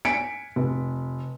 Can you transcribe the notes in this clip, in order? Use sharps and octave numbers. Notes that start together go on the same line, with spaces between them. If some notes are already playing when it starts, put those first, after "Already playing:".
G#5 B6 C#7 D7
F1